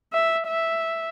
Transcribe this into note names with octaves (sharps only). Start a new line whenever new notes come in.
E5
E5